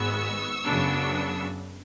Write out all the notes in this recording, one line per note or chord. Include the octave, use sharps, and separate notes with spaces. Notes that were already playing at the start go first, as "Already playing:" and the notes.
Already playing: G#1 G#2 G#3 B3 C#6 E6
F#2 C#3 F#3 B3 D4